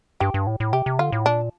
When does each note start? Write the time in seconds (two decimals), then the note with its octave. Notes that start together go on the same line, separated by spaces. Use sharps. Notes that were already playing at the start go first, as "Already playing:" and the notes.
0.20 G2 G4
0.34 G2
0.47 A2
0.60 A2
0.73 C3 G4
0.86 C3
0.99 D3 F4
1.12 A2
1.26 A#2 D4